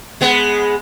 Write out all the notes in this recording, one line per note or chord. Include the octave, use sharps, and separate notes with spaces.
G#3 B3